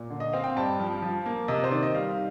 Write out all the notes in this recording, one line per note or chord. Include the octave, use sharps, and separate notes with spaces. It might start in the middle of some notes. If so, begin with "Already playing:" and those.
Already playing: A#2
D3
D#5
C4 F5
G5
G2 A5
F3
F3
A#3
C3 D#5
C5
D#3 D5
D#5
G3 F5